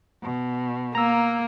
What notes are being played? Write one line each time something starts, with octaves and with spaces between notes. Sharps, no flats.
B2
A#3 A#5 E6